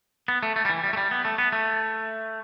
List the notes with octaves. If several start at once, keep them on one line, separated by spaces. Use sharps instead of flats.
B3
A3
A3
G3
E3
G3
A3
G3
B3
A3
B3
A3